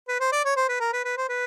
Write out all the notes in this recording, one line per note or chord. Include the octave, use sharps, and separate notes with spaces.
B4
C5
D5
C#5
C5
B4
A#4
B4
B4
C5
B4